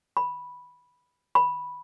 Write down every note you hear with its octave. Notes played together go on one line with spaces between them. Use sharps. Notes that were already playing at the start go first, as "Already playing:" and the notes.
B5
B5